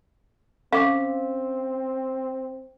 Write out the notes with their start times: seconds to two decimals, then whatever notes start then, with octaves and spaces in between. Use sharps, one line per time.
0.73 C4 C#4 F5 D6